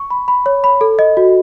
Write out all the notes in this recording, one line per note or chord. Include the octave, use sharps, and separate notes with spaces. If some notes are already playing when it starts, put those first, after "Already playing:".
Already playing: C#6
B5
B5
C#5
B5
A4
D#5
F#4